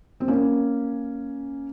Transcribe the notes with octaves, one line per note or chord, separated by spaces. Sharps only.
C4
A#3 C#4